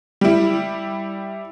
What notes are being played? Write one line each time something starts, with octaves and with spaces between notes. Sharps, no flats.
G3 E4